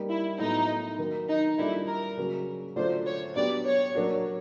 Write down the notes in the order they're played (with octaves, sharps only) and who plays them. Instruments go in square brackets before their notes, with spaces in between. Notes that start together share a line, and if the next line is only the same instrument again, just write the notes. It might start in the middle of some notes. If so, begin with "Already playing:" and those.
Already playing: [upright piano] G3 A#3 D#4
[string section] E4
[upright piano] A2 F#3 B3 E4 [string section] D#4
[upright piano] D#3 F#3 A#3
[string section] D#4
[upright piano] G3 A#3 D4 F4 A4 [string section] E4
[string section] A#4
[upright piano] C#3 F#3 A#3
[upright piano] D3 F#3 A3 D4 F4 [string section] C5
[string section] C#5
[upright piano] F#3 B3 D4 G4 [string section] D5
[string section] C#5
[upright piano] F#3 A#3 D4 F#4